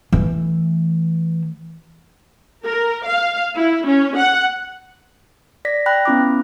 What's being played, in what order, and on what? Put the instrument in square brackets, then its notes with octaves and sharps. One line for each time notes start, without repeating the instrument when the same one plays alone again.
[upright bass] E3 A3
[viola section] A#4
F5
E4
C#4
F#5
[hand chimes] D5 A#6 B6
G5 B5 F#6 A#6
B3 C#4 E4 B5 D6